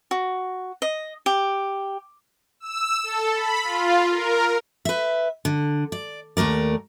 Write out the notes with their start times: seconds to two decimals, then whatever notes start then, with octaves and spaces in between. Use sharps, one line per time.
0.11 F#4
0.82 D#5
1.26 G4
2.60 E6
3.04 A4
3.34 B5
3.64 F4
4.11 A#4
4.85 B4 E5
5.45 D3
5.92 D5
6.37 D#2 A3 A#4 D5